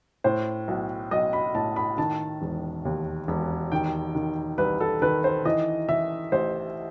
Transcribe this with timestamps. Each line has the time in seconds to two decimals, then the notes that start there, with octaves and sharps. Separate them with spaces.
0.24 A2 C5
0.68 B1
1.11 B1 D#5
1.33 B5
1.55 A2 A5
1.76 B5
1.98 D#3 A5
2.42 E1
2.85 D#2
3.28 E1
3.72 D#3 G5
4.15 D#3
4.58 C2 B4
4.80 A4
5.02 D#3 B4
5.24 C5
5.45 E3 D#5
5.89 E3 E5
6.32 A1 C5